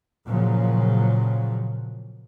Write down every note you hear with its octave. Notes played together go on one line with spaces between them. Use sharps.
A#2 C#3 F3 F#3